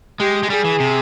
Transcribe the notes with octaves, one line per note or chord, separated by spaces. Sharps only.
G#3 G4
G#3
G3 G#4
E3
C3